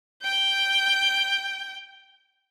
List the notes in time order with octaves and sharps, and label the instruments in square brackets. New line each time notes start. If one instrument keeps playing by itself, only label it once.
[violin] G5 G6